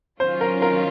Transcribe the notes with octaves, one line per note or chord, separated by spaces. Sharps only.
D#3 F#3 C#4 F4 C5
A#4
A#4